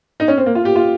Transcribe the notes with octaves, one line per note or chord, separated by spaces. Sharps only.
D#4
C#4
C4
A#3
F4
G4
F4